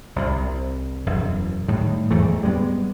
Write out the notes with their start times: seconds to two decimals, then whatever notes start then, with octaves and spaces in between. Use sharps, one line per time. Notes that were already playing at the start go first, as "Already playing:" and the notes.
0.16 C2 C3
1.06 E1 F#2
1.68 A2 D#3 G3
2.11 E2 G#2 E3 A3
2.43 G3 G#3 A#3 B3